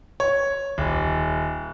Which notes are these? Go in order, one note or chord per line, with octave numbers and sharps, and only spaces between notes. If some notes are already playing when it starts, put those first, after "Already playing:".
C#5
D#1